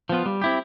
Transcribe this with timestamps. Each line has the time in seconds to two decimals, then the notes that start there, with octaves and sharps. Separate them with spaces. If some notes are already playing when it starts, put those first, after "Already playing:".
0.09 F3 B3 F4
0.26 G3
0.42 C4 E4 G4